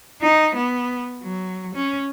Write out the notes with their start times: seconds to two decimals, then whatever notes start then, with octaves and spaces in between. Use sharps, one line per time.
0.22 D#4
0.55 B3
1.23 F#3
1.75 C#4